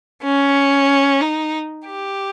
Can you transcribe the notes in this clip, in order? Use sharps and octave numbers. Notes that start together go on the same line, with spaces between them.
C#4
D#4
G4